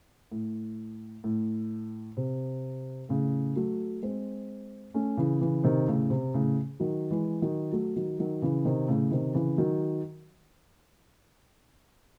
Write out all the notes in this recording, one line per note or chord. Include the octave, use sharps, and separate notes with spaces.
A2
A2
C3
A2 C#3
F#3 A3
G#3 C4
A3 C#4
C#3 E3
C#3 E3
C3 D#3
A2 C#3
C3
A2 C#3
D#3 F#3
E3 G#3
D#3 F#3
F#3 A3
D#3 F#3
D#3 F#3
C#3 E3
C3 D#3
A2 C#3
C3 D#3
C#3 E3
D#3 F#3